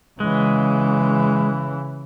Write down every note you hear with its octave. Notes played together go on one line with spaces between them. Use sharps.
C#3 E3 G#3